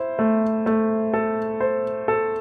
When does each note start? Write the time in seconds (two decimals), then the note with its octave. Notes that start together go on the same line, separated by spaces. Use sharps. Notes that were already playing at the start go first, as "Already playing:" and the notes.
Already playing: E4 C5
0.19 A3
0.66 A3
1.14 A4
1.61 C5
2.08 A4